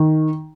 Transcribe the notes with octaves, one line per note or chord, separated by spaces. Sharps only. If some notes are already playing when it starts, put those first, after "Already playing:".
Already playing: D#3